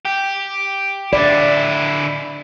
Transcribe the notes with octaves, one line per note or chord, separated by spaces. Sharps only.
G4
D3 E4 D5